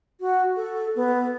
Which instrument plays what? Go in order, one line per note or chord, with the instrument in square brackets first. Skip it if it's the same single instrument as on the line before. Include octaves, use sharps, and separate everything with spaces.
[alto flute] F#4
A4
B3